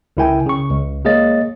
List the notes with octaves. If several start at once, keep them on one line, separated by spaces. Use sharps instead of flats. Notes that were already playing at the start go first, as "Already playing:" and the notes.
C#2 C#3 E4 A#4 G5 G#5
C#3 C#6
C#2
G#3 A#3 G#4 C#5 D#5 A6